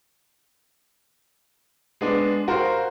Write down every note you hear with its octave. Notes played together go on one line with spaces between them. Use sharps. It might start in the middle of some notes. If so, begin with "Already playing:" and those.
G#3 B3 D4
F#4 A#4 C5 F5